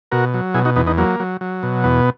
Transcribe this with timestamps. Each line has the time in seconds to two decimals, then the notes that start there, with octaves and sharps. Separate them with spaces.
0.12 B2 F#4 A#4
0.34 F#3
0.54 B2 E4 G#4
0.65 D#4 F#4
0.76 E2 B3 D#4
0.87 B3 D#4
0.98 F#3 A#3
1.20 F#3
1.41 F#3
1.63 B2
1.84 E2 B3